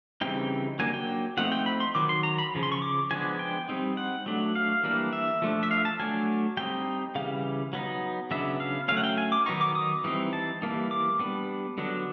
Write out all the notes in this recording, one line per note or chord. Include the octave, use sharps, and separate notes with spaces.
C#3 E3 G3 C4 D#4 G5
F#3 A#3 D4 G#5
G5
F3 A3 C4 D#4 F#5
G5
B5
C6
D#3 F#3 D6
C6
A#5
B5
C#3 F3
C6
C#6
D6
F3 G#3 B3 D4 G#5
G5
G3 C4 D#4
F#5
F#3 A3 D4
F5
E3 G3 A#3 D4
E5
F3 A3 D4
E5
F5
A5
F#3 A3 D4 G#5
G3 C4 D#4 G5
C#3 E3 G3 F5
F#3 B3 D#4
C#3 F#3 B3 D4 E5
F5
F#3 A3 C#4 F5
F#5
G5
G#5
D6
D#3 F#3 B3 D#4 C#6
D6
D#6
E3 G3 C4 D#4
A5
E3 G3 A#3 D#4
D6
G3 B3 D4
D3 F#3 B3 D4